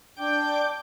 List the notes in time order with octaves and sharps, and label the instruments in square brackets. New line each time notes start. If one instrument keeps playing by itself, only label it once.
[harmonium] D4 G5 [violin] D6 G6